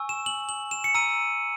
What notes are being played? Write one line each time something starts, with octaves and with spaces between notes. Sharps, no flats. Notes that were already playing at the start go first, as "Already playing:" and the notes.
Already playing: G#5 C#6 E6
E7
F#7
F#7
E7
C#7
A#5 E6 D#7